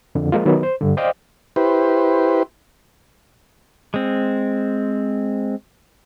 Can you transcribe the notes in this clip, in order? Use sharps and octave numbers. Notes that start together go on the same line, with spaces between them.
F2 D3
F3 G#3 A#3 F4
D#3 F#3 B3
C5
G2 D3
C5 D5 D#5 F5 G5
E4 G4 B4 C5
G#3 C4